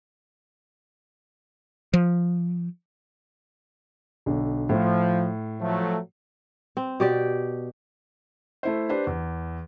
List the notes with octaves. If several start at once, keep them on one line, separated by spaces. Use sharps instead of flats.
F3
B1 D3
A2 F3
F3 F#3 A3
C4
B2 G4 D5
A3 E4 C5
D4 G4 B4 C5
E2